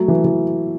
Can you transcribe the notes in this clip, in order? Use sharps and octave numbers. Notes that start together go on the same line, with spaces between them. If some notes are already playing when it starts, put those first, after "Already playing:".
Already playing: F#3 A3
E3
E3